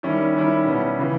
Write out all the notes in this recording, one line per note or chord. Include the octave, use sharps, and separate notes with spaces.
D#3 G3 C#4 E4
D#3 G3 C#4 E4
B2 G3 C#4 E4
C#3 E3